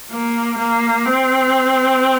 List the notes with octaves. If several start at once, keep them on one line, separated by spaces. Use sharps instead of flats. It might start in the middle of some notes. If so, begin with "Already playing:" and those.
A#3
A#3
C4